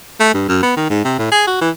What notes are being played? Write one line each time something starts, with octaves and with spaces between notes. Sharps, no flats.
A3
G2
F#2
B3
D#3
G#2
C3
A2
G#4
F#4
E3